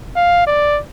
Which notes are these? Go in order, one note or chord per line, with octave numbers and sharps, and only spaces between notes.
F5
D5